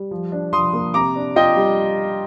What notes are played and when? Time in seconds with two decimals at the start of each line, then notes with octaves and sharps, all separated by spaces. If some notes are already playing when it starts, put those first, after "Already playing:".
Already playing: G3
0.11 F3
0.32 D4
0.53 F3 C6 D#6
0.73 A#3
0.94 C3 A#5 D6
1.16 D4
1.36 F4 D#5 G5
1.56 G3